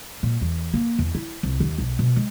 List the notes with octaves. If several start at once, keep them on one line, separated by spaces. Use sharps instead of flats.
A#2
E2
A#3
E2
E4
C2
D#2
B1
B2
G#3